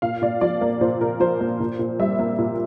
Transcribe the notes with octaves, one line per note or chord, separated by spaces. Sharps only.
A#2 F5
A#2 D5
F3 D5
A#3
A#2 C5
A#2 A#4
F3 C5
A#3
A#2
A#2
G3 E5
A#3
A#2